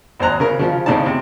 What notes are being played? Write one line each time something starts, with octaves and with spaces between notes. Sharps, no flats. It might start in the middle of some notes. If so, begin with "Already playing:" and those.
G#1 D#2 C5 A#5 F#6
C#3 A#4
C#3 F3 F4
A2 C#3 C4 D#4 D5 A5
C3